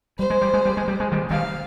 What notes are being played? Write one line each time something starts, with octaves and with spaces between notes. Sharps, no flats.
G3 C5
G#3
G3
G#3
G3
G#3
G3
G#3
D#3 G3
D#3 G3 F5